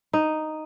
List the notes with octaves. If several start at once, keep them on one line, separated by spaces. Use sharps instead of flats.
D#4